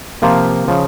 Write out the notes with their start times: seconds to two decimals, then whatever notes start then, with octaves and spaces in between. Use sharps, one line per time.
0.22 C3 F3 A#3 F4 C5
0.68 C#3 F3